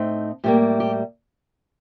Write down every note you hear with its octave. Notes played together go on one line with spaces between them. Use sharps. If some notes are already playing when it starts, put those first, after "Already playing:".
Already playing: A2 A3 C4 D#4
A2 G3 A#3 G4
G4